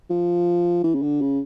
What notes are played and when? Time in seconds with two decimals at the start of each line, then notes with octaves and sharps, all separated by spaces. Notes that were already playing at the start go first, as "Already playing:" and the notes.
0.10 F3
0.84 E3
0.95 C#3
1.02 D3
1.21 C#3